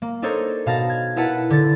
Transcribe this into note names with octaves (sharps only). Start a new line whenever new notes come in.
A#3
D4 D#4 A4 A#4 C5 C#5
B2 F5 A5 A#6
G#6
E4 A#4 B4 F#5 A5
D3 A6